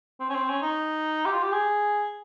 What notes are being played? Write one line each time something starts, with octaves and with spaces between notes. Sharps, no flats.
C4
C#4
C4
C#4
D#4
G4
F4
G4
G#4